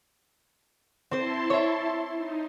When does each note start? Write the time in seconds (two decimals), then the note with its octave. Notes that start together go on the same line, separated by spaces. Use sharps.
1.11 C4 E4 C5 A5 C6
1.50 C#5 E5
2.16 D#4